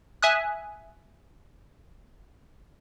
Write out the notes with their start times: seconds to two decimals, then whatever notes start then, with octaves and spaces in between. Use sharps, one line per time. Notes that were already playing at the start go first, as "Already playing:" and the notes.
0.23 E5 G#5 D#6 F#6